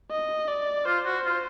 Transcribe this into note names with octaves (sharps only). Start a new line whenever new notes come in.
D#5
D5
F4 C5
F#4
F4